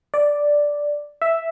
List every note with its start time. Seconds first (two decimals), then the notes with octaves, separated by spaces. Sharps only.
0.14 D5
1.22 E5